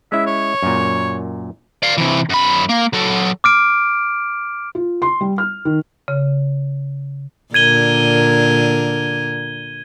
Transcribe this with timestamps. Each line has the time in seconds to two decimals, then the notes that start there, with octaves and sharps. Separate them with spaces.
0.12 G#3 C#4 E4 E5
0.26 C#5
0.63 F#2 A#2
1.83 D5 F5
1.98 C3 E3
2.29 F#2 B5
2.69 A#3
2.93 F#3 A4
3.44 D6 F6 D7
4.75 F4
5.02 C6
5.21 G3
5.38 F6
5.65 D#3
6.08 C#3
7.54 A#2 D3 A#4 G#6 D#7 G7